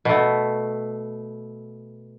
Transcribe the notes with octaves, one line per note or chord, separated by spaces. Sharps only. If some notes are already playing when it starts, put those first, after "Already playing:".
B2 A3